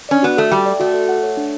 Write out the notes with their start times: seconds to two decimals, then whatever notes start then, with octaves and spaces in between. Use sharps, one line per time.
0.09 C#4 D5
0.22 B3 F#4
0.37 A3 A4
0.51 G3 G5
0.66 D5
0.80 A3 F#4
0.94 A4
1.09 F#5
1.23 C#5
1.37 D4